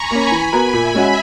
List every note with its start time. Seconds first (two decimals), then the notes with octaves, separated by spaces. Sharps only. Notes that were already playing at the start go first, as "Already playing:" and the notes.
Already playing: G#5 A#5 B5 C#6
0.11 A#3 C#4
0.31 E3
0.53 B3 F#4 A#4
0.73 A#2 E5 G#5
0.95 G#3 C#4 F#4